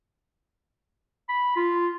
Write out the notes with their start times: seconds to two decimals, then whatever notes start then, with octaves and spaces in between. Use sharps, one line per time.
1.29 B5
1.56 F4